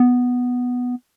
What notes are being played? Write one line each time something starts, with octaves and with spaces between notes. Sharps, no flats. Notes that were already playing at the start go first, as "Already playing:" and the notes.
Already playing: B3